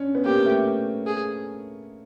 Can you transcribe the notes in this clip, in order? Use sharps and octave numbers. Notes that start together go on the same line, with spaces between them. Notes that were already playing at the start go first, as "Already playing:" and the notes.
Already playing: C#4 D4
B3
A#3 G4
A3
G#4